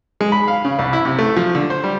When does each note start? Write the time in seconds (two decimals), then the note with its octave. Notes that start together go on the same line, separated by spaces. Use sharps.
0.21 G#3
0.32 B5
0.48 F5
0.65 C#3
0.79 C2
0.93 E4
1.05 C3
1.19 A3
1.37 F3
1.55 D3
1.70 C5
1.84 G3